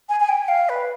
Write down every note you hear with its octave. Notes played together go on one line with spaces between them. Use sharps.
G#5
G#5
G5
F5
B4